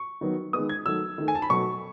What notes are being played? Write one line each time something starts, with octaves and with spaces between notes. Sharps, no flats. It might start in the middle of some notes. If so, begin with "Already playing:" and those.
Already playing: C#6
D#3 F#3 B3
D#3 G#3 B3 D#6
G#6
D#3 F#3 A3 E6
D#3 A3
G#5
A5
B5
B2 F#3 A3 C#6